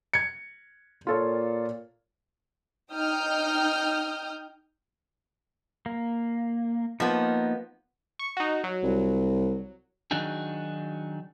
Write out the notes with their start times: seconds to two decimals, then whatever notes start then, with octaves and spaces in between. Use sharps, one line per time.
0.14 G#6 C#7
1.07 A#2 F4 A4 C#5
2.91 D#4 G5 D#6 F6 G6
5.86 A#3
7.00 F3 A#3 B3 D#4
8.19 C#6
8.37 D#4 F#4
8.64 F#3
8.83 C2
10.11 D#3 F#3 D4 D#4 F#4 G#4